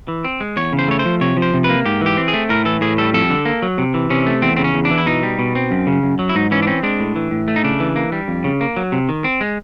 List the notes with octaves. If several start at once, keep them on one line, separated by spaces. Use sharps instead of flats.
E3
C4
G#3
E2 C#5
C#3
C5
A3 C#5
C5
F3
C3 C#5
F3
C5
C3
B4
A#3
G#2 G4
E3 G4
C4
G#4
A3
A2 A#4
E3 A4
A2 G#4
G3 A4
F2 A4
D3
A#3
F#3
C3
E3
C3 C#4
A3
E2 C4
C#3 C4
C#4
E2
D4
E3
E4
B2 D#4
G3
B2
C4
F#2
C#3
F#2
F#3
E4
G#2 D#4
E3 C#4
D4
C4 C#4
G#3 D4
A2
E3
A2
A3
D#4
C#3 D4
E3
A#3
G3
F2
C#3
A#3
F#3
C3
D#3
C4
G#3